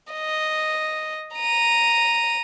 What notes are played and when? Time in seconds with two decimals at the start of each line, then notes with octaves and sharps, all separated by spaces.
0.13 D#5
1.36 A#5 D#7